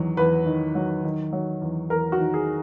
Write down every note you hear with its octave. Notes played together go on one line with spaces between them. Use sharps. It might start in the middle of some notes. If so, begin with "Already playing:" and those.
Already playing: E2 D#3 F#3
E2 B4
D#3
F#3
D#3
F#3
E2
E2 A#4
F#4
D#3
G#4